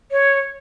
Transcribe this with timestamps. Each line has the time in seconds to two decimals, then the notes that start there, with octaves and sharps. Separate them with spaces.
0.12 C#5